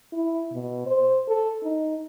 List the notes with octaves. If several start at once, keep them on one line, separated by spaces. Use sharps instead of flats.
E4
B2
C5
A4
D#4